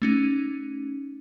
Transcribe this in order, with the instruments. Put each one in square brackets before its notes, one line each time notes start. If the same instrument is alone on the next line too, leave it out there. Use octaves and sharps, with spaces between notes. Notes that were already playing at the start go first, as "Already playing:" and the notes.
[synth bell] A3 C#4 D#4